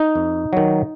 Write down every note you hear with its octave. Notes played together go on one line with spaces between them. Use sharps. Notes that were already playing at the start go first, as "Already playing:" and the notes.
Already playing: D#4
F2
D#3 F#3